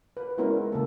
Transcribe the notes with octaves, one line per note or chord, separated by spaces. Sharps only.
B4
G#3 B3 C#4 E4 F#4 A#4
C#3 A#3 A4